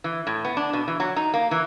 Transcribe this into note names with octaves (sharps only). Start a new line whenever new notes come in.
E3
A2
B3
D4
B2
E3
F#3
D#4
A#3
E3